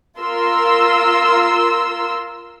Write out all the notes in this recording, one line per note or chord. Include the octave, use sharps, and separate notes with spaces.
F4 A#4 C6 E6